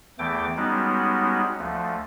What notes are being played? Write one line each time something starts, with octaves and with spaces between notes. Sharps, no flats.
E2 E3 A3 G5 D6
G3 G#3 B3 C#4 D#4 F#4
D2 F3 A3